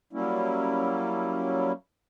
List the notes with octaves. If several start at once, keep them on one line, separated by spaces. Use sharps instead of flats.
F#3 G3 A#3 C#4 E4